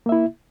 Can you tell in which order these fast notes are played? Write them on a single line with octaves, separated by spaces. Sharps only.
A#3 E5 E4